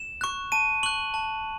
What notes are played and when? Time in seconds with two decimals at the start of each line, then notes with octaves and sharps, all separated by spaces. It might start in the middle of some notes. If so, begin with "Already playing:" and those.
Already playing: E7
0.21 C#6 F#6
0.52 A5 D#7
0.83 C#6 F#6 F#7
1.14 A5